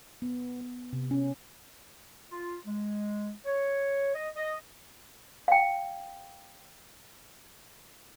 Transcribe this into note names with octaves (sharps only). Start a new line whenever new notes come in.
B3
B3
C3
C#4
F4
G#3
C#5
D#5
D#5
F5 G5